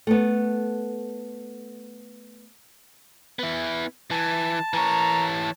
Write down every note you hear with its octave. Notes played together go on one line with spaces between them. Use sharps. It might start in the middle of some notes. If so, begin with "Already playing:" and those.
A3 B3
B3 E4
E3 A5
E3 A#4 C#5 A#5